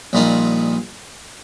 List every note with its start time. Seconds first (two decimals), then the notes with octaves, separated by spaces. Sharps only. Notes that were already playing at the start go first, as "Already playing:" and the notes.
0.13 A#1 A#2 G3 D#4